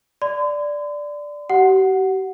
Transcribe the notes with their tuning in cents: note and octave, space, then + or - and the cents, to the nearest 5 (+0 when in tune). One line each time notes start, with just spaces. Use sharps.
D5 +0 C6 -45
G4 -45 F#5 +0